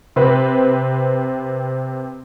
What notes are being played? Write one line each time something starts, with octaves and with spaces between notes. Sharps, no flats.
C3 C4 B4